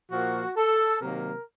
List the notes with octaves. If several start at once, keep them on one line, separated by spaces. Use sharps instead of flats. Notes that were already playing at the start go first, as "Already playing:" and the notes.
A#2 F3 A#3 F#4
A4
C3 D#3 F#3 A#3 A#4